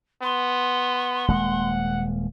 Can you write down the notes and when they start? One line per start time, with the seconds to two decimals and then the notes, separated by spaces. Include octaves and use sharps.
0.23 B3 C6
1.28 D#1 G#3 A#3 F#5